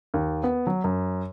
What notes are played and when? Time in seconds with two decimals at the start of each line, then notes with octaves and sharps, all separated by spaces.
0.14 D#2
0.44 B3
0.67 F#3
0.84 F#2